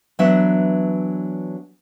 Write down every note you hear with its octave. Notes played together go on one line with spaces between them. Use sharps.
E3 F#3 B3 D4 E5